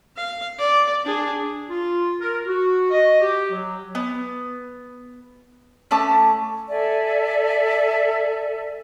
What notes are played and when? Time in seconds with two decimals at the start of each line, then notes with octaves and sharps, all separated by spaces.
0.16 F5
0.58 D5
1.05 D4 G#4
1.68 F4
2.20 A#4
2.45 F#4
2.90 D#5
3.20 G4
3.51 F#3
3.95 B3
5.91 A3 C#4 A5 D6
6.69 A4 D5 E5 G#5